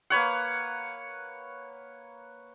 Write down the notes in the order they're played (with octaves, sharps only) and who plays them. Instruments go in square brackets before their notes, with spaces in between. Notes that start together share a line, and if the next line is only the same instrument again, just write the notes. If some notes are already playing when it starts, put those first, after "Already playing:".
[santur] A#3 B4 C#5 F#5